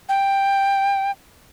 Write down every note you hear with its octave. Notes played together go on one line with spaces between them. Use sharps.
G5